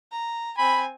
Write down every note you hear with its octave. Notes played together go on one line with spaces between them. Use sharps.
A#5
C4 G#5 B5